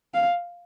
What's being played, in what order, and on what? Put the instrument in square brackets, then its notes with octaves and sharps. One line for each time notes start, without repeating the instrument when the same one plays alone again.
[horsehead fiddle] F5